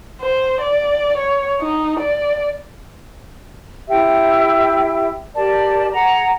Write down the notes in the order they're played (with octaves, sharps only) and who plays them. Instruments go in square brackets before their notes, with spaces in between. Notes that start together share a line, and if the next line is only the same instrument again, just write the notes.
[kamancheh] C5
D5
C#5
D#4
D5
[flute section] E4 G4 E5 G5
G4 A#4 D5 A5
G#4 F#5 A#5